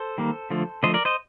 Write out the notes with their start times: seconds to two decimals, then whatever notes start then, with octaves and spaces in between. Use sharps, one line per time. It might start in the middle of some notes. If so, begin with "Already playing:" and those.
Already playing: A4 C5
0.18 D#3 G3 A#3
0.50 D3 F3 A3
0.83 D3 F3 A3 C5 D#5
0.94 A#4 D5
1.05 C5 D#5